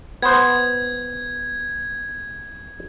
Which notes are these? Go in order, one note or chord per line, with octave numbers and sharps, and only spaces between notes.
B3 C5 G#6